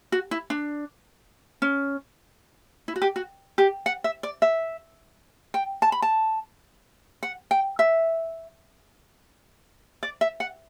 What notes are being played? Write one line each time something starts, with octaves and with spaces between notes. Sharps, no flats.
F#4
E4
D4
C#4
E4
F#4
G4
F#4
G4
F#5
E5
D5
E5
G5
A5
B5
A5
F#5
G5
E5
D5
E5
F#5